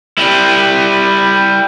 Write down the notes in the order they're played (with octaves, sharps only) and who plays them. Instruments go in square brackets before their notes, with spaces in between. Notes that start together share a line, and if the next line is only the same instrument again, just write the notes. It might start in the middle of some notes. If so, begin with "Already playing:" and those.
[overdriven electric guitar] G3 E4